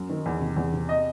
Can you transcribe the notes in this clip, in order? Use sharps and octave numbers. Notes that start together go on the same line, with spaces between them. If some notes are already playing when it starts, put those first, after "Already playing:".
Already playing: F#2
D#3
E2
C3
E2
C3
D#5